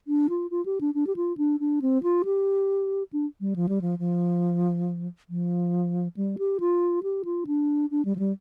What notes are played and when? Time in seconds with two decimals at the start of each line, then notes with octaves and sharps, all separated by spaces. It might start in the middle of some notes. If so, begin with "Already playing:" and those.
0.08 D4
0.30 F4
0.51 F4
0.66 G4
0.81 D4
0.95 D4
1.07 G4
1.16 F4
1.38 D4
1.60 D4
1.82 C4
2.03 F4
2.25 G4
3.13 D4
3.41 G3
3.56 F3
3.69 G3
3.81 F3
3.99 F3
5.30 F3
6.17 G3
6.38 G4
6.60 F4
7.03 G4
7.25 F4
7.47 D4
7.91 D4
8.05 G3
8.16 F3
8.19 G3